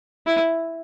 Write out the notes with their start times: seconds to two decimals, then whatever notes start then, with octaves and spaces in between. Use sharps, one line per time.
0.27 E4